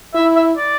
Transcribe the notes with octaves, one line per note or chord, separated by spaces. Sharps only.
E4 E5
E5
D5